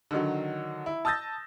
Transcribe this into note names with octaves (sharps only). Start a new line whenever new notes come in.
D3 D#3 F#3
E4
A5 D#6 E6 G6 A6 A#6